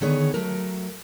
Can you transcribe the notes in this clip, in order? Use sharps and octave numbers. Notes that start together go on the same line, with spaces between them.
D3 D#3 B3 G#4 C#5
F#3 A3 A#4